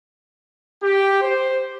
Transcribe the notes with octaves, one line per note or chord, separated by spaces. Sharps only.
G4
C5